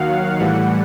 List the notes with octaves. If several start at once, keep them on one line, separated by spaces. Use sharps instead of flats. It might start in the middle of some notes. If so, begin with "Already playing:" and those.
Already playing: D#2 D#3 F#3 F5 F#5
A2 E3 G3 F#5